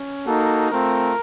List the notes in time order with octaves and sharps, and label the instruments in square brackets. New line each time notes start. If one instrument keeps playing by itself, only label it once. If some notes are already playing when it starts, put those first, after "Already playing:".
Already playing: [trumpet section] C#4
A#3 D#4 F#4 A4
A3 C4 F4 A#4